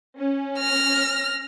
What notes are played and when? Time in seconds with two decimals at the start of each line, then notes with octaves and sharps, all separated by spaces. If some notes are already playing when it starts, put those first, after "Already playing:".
0.18 C#4
0.59 F6 A#6